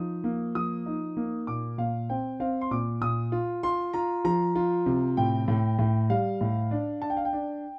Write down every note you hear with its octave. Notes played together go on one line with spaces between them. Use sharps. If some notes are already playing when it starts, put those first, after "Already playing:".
Already playing: F3 D#4 D#6
A#3
F3 D#6
D#4
A#3
A#2 D6
A#2 F5
C4 G5
C4 F5
C6
A#2 D6
A#2 D#6
F4
F4 C6
F4 A#5
F3 A#5
F4
C3
A2 G5
A2
A2
G3 F5
A2
D4
D4 A5
G5
F5
G5
D4